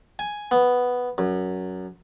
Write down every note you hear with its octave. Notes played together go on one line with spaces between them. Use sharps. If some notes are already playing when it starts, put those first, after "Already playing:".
G#5
B3
F#2